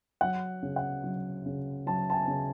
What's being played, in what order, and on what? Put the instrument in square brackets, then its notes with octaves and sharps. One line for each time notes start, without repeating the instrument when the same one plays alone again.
[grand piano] F#3 F#5
C#3
F#5
F#3
C#3
F#3 A5
A5
G#5
C#3